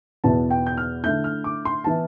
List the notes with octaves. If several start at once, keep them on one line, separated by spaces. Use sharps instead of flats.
E2 B2 B3 E4 A5
G5
G6
F6
D3 A3 E4 G6
F6
D6
C6
E3 B3 E4 A5